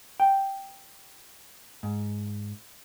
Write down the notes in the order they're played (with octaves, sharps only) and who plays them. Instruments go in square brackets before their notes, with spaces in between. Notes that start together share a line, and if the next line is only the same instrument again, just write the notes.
[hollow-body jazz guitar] G5
G#2